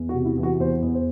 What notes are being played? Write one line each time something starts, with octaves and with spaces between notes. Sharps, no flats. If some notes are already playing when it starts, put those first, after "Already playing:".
Already playing: E2
F#4
C3
E4
E3
F#4
E2 C5
E2
C5